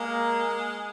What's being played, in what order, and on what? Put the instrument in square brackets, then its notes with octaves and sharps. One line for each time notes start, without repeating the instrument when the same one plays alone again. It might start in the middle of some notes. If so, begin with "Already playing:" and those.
Already playing: [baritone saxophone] G#3 [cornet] A#3